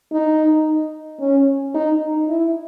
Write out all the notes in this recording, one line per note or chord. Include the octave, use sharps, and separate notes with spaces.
D#4
C#4
D#4
E4